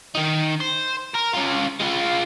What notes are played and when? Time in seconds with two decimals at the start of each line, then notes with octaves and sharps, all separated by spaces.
0.15 D#3 D#4
0.60 C5
1.15 A#4
1.35 C#4 F4
1.80 G#3 F4